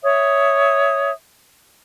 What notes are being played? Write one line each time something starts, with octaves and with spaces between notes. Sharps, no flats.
C#5 E5 D#6